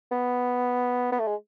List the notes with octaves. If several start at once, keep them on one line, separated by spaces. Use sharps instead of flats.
B3
B3
A3
G#3